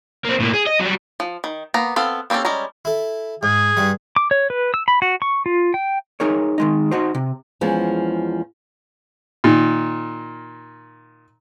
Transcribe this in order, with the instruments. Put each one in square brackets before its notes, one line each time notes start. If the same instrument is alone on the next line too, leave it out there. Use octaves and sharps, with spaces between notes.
[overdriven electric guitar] A#3 C4
A2 A#3
G#4
D#5
F#3 G3
[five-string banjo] F3
D#3
A#3 B3 A#5
B3 C4 A4 F5
A#3 C4 C#4 G4 A4
G3 G#3 C#4 A#5
[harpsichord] E4 A4
[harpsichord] G#2 [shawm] G#4
[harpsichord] G2 G3
[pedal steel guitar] D6
C#5
B4
E6
B5
F#4
C#6
F4
G5
[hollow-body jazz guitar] D#4 G#4 A#4 C#5
D#3 G#3 D#4
D#4 F#4 C5
C3
[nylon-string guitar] E2 F3 G#3 C#4
[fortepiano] A#2 D#3